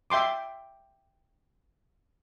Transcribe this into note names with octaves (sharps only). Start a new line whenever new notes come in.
E5 G5 C6 D6